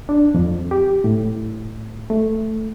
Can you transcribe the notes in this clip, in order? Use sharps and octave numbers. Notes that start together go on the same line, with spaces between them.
D4
F2
G4
A2
A3